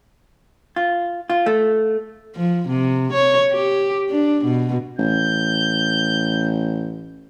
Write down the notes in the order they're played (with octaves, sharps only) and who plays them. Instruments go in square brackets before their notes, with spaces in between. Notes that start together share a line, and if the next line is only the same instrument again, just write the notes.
[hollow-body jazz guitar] F4
F4
A3
[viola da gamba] F3
C3
C#5
G4
D4
B2
[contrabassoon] A1 [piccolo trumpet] G6